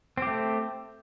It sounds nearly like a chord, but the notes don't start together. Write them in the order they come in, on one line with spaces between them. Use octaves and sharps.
C4 G4 A3